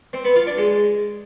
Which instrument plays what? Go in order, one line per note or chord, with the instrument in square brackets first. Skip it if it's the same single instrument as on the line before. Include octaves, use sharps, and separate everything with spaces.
[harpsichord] C4
B3
F4
D4
G#3